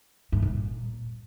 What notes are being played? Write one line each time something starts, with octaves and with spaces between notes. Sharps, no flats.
G2
A#2